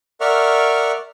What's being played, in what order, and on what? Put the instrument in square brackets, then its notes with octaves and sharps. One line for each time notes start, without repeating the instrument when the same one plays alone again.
[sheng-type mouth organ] A#4 D5 E5 F#5 C#6 F6